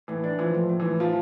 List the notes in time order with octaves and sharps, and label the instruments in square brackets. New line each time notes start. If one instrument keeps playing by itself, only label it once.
[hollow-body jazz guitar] A2 [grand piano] E3
[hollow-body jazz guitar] D4
[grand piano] E3 [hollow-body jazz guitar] F3
[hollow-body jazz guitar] A2
A2
[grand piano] E3
[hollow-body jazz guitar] A2
[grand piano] F3 [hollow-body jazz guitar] F4